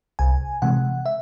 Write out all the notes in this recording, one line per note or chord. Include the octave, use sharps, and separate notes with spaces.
C2 G#5
C3 E3 G#3 F#5
E5